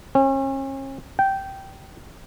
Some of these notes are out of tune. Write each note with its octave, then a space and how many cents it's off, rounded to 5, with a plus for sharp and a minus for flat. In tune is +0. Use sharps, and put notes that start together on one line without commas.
C#4 -40
G5 -10